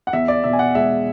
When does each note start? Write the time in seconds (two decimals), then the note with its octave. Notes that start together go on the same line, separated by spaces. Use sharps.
0.07 F#5
0.13 E2 E5
0.28 D5
0.44 B2 E5
0.53 G#5
0.59 F#5
0.75 G#3 E5